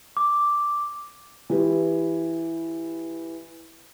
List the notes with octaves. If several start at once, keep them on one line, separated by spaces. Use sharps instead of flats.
D6
E3 G4 B4